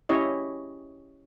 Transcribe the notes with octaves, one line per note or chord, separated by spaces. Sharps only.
C#4 E4 G4 C#5 D#5